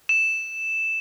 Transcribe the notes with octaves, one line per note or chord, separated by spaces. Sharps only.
E7